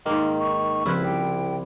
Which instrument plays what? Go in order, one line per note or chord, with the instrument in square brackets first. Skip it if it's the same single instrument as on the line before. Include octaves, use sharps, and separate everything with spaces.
[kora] G#2 A#3 [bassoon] D#3
[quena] C#6
[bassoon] C2 [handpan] C#3 F3 C4 [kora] E4 F4 B4
[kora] G3 [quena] G5